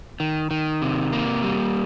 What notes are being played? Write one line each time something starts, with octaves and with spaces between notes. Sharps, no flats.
D#3
D#3
C3
A#3
G3